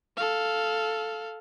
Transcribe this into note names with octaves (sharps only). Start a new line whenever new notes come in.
A4 F5